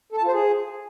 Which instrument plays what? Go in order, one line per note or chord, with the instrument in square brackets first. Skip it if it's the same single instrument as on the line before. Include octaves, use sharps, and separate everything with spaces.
[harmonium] A4
A5
F4
C5
G#4